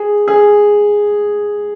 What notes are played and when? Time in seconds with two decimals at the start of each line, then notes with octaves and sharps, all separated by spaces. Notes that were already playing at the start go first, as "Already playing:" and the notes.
Already playing: G#4
0.28 G#4